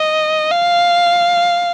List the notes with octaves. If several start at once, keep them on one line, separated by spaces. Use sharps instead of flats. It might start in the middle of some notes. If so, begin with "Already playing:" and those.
Already playing: D#5
F5